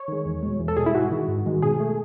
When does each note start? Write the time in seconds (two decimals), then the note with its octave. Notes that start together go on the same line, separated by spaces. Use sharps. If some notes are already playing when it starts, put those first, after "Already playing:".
Already playing: C#5
0.08 D#3 G#3
0.25 E2
0.43 B2 G#3
0.60 E2
0.68 A4
0.77 B2 G#3 G#4
0.86 E4
0.95 G#2 F#4
1.11 D#3 G#3
1.28 G#2
1.46 D#3 G#3
1.62 B2 G#4
1.80 A3